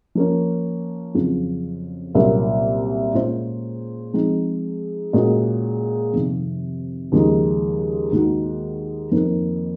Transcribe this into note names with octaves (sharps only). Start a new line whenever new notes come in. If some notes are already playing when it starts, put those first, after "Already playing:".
F3 A#3 C#4
F2 C#3 F#3 C4 F4
C2 A#2 F#3 A#3 C#4
A#2 G#3 C#4 F4 C5
F3 G#3 C4 D#4
A#2 G#3 C#4 F#4
F2 C3 D#3
D#2 C#3 F3 G#3 D#4
D#2 D#3 G#3 D#4 F#4
F2 D#3 A#3